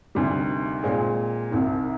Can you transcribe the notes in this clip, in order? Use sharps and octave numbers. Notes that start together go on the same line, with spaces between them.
D2 C3 D#3 G3
A#2 G#3 C4
C2 C3 D#3